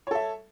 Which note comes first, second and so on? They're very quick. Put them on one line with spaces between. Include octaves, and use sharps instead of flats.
C#5 A4 E5